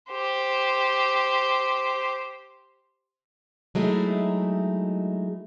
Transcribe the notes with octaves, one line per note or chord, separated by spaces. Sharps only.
G4 C5
F#3 G#3 A3 D#4 E4